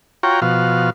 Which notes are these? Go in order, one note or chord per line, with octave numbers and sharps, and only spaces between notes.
F4 F#4 C#5 G5 A#5
B2 F3 F#4 F5